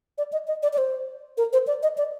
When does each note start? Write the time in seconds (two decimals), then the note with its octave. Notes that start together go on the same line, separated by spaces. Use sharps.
0.18 D5
0.33 D#5
0.47 D#5
0.63 D5
0.73 D5
0.78 C5
1.38 A#4
1.53 C5
1.67 D5
1.83 D#5
1.98 D5